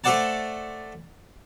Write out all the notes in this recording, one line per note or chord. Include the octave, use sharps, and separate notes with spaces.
A3 A4 C5 D5 F#5 A5